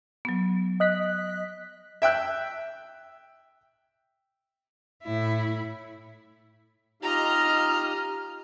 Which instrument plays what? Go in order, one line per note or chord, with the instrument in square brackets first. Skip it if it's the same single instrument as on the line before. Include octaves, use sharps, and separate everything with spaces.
[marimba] F#3 B3
[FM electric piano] D#5 F#6 B6
[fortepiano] E5 G5 E6 F#6
[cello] A2 E4
[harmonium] D#4 G4 [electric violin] F4 F6 [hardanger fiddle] D#5 A#5